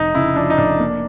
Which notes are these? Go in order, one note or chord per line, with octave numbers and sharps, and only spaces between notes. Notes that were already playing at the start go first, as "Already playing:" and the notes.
Already playing: F1 D#4
C#3 E4
F3 D4
D#4
F1 D4
A#3